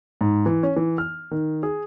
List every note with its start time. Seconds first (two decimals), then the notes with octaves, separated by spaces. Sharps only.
0.21 G#2
0.46 E3
0.63 C#4
0.76 E3
0.98 F6
1.31 D#3
1.63 G#4